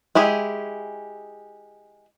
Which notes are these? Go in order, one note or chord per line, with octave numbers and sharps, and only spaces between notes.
G#3 E4 G4 G#4